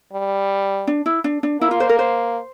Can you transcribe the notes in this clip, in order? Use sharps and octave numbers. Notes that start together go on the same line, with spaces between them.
G3
D4
E4
D4
D4
A#3 E4
F4
C5
A#4
C5